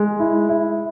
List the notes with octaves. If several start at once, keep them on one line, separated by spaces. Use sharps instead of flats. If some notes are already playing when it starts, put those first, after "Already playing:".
Already playing: G#3
E4
E4